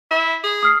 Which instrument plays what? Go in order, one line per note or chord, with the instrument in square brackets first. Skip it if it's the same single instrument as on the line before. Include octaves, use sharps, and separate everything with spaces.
[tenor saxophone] E4
G#4
[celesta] D#6 F6 C7